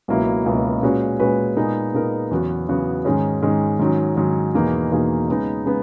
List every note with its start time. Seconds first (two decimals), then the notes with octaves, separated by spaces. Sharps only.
0.08 C#2 B2 F#3 A#3 E4
0.46 C#2 B2 F#3 A#3 E4
0.82 A#2 G#3 C#4 F#4 B4
1.20 A#2 G#3 C#4 F#4 B4
1.56 A#2 G#3 B3 D#4 A#4
1.94 A#2 G#3 B3 D#4 A#4
2.31 E2 C#3 F#3 B3 F#4
2.68 E2 C#3 F#3 B3 F#4
3.05 G#2 D#3 G#3 C#4
3.42 G#2 D#3 G#3 C#4
3.79 G#2 D#3 F#3 C#4
4.17 G#2 D#3 F#3 C#4
4.54 E2 B2 A#3 D#4 G#4
4.91 E2 B2 A#3 D#4 G#4
5.28 C#3 G#3 B3 D#4
5.66 C#3 G#3 B3